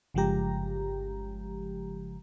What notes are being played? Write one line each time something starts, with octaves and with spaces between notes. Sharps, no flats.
G1 C#3 F3 G#3 G4 A#5